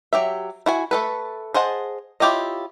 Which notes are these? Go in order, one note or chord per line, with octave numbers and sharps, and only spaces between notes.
F#3 G4 E5
E4 F#4 G#5
A3 A4 B4
G#4 C5 D#5 F#5 A5
E4 F4 G4 C#5 D#5